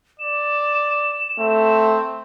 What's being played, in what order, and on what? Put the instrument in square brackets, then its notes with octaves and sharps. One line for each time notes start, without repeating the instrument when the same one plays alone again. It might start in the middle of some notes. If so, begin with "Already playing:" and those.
[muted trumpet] D5 [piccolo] E7
[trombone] A3 [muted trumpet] C4